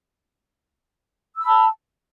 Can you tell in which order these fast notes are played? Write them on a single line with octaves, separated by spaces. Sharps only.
E6 B5 A5